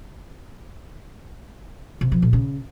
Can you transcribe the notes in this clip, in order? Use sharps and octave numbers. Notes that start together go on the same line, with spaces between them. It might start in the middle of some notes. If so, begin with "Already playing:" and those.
C3
F3
A#2
C#3